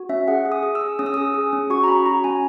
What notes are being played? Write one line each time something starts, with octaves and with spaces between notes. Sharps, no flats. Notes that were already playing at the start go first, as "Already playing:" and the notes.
Already playing: F#4
C#4 E5
G#4 F#5
G#4
D#6
G#4
E6
G#4
C#4 D#6
E6
G#4 D#6
G#4
C#4
F#4 C#6
A#5
C#4 B5
F#4 A#5
C#4 G#5